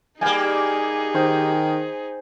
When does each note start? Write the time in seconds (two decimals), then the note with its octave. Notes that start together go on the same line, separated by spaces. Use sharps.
0.21 G3 A#3 D#4 G#4 G5 G#5
1.15 D#3 C5